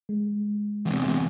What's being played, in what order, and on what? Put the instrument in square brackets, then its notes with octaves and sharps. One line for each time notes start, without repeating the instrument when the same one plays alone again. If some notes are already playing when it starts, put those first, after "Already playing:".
[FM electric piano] G#3
[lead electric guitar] E2 C3